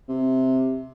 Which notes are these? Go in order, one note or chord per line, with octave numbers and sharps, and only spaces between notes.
C3